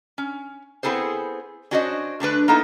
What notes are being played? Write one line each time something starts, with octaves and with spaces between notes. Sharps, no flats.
C#4
B3 C4 E4 G#4 A4 C5
C#4 D4 F#4 C5 C#5 D#5
D3 A3 D4 B4
A#3 B3 D#4 E4 A4